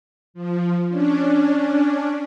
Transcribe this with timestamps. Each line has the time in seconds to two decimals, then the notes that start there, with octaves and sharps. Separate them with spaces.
0.34 F3
0.89 C#4 D4